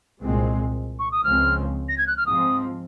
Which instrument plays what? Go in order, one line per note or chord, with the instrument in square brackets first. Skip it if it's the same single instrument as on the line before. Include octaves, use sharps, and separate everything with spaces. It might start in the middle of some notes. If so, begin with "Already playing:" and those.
[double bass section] C2 A#2 G#3 C4
[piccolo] C#6
D#6
[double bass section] C#2 C#3 F3 C4 [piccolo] F6
[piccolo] A#6
G#6
F#6
F6
[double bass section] G#2 F3 C4 [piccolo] D#6